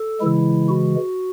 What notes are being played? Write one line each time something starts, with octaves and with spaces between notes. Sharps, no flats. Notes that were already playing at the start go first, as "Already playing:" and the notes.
Already playing: A4
C#3 E3 G#3 E4
F#4